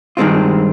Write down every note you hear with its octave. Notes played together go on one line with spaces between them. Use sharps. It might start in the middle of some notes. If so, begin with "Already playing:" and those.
G2 D#3 G#3 C4 F4